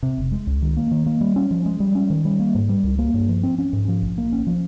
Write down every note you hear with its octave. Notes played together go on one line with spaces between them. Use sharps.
C3
F1
G#3
C#2
D#3
A#3
D#3
A#3
G3
C#4
F3
G#3
G3
C#4
D#3
G3
A#3
G#2
G3
C#2
A#3
G2
F3
C4
C#4
G#2
F3
A#1
A#3
C#4
F3